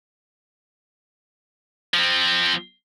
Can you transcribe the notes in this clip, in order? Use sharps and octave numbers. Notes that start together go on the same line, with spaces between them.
F3 C4